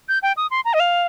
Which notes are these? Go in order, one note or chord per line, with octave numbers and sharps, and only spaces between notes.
G6
G5
D#6
C6
A#5
D#5
F5